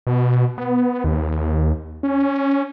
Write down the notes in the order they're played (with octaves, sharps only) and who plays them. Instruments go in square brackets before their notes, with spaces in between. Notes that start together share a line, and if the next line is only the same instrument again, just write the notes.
[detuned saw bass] B2
B3
D#2
C#4